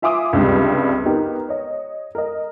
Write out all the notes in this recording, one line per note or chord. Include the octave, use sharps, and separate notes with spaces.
F4 E5 G#5 C6 D6 D#6
C#2 G2 C3 G3
B3 D#4 G4 A#4
C#5 D#5
A#4 D#5